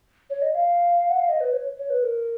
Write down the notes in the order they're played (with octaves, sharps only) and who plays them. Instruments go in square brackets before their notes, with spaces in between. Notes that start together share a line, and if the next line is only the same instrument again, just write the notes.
[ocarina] C#5
D#5
F5
F#5
F5
D#5
B4
C#5
C#5
B4
A#4